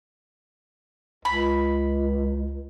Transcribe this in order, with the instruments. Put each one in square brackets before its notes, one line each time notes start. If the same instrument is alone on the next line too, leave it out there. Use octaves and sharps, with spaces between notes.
[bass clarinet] C#2 [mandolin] B5